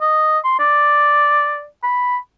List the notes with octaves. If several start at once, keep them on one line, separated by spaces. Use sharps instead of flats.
D#5
C6
D5
B5